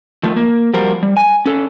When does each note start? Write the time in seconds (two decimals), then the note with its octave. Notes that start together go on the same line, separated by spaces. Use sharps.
0.23 D#3 F3 A3
0.36 A#3
0.74 F3 G3 F#4 A#4 C5
1.03 G3
1.17 G#5
1.46 C#4 A4